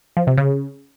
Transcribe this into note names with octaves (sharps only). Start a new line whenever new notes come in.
F3
C3
C#3